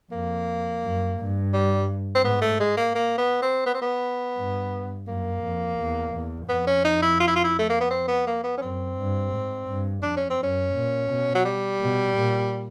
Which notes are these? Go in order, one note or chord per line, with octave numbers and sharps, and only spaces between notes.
F2 A#3
F#2
G2
G3
C4
G#2 B3
A3
G#3
A#3
A#3
B3
C4
B3
C4
B3
G2
F#2 A#3
F2
E2
E2
F2 B3
C#4
D#4
E4
F4
E4
F4
E4
A3
A#3
B3
C4
B3
A#3
B3
C#4
F#2 C4
G2
G#2
G2
F2 D4
C#4
C4
F#2 C#4
A#2
B2
F#3
G3
B2
A#2